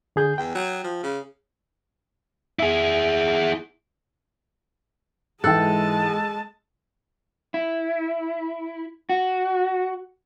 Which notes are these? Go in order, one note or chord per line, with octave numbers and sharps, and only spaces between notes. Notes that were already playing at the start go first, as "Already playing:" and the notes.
D3 G#4 G6
E2 G5
F#3
F3
C#3
E4 G#4
G#2 E3 G#3 A4 G5 A5 E6 F#6
E4
F#4